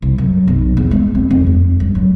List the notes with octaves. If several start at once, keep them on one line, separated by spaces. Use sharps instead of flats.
C2
F#2
B1
E2
G#3
C4
F2
F2
G2
F#3